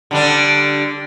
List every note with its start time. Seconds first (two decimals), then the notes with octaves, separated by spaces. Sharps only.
0.11 D3 G3 D4